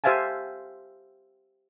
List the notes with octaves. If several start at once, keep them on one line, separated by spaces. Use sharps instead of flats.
G4 C5 E5 F5 G#5 A5